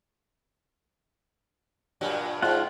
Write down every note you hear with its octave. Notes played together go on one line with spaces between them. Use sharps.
G2 A#2 F#3
G#2 F4 F#5